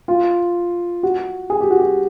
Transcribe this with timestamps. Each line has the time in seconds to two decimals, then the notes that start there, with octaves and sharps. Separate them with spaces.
0.08 F4
1.03 F#4
1.50 G#4
1.61 G4
1.71 F#4
1.79 G4